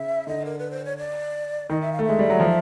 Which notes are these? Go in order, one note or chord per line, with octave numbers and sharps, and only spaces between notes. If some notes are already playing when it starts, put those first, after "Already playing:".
Already playing: C#3 E5
D3 D#5
A#4
B4
C5
C#5
D5
D#3 D#5
E5
F5
A3
G#3 E5
G3
F#3
F3